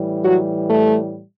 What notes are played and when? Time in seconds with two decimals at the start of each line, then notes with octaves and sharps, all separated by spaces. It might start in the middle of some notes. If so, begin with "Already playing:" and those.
Already playing: A2 E3 G3
0.22 F#3 F#4
0.68 A3